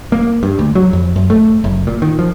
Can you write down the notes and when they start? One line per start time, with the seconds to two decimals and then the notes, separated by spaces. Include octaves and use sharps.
0.12 A#3
0.43 G2
0.59 D2
0.75 F#3
0.93 F2
1.16 F#2
1.30 A3
1.64 F#1
1.87 A#2
2.02 D#3
2.19 F3